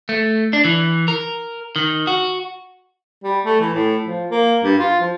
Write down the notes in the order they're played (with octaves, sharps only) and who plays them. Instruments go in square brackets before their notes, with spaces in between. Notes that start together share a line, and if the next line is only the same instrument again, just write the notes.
[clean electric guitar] A3
D4
E3
A#4
D#3
F#4
[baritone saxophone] G3
A3
E3
A2
F3
A#3
G2
F4
F3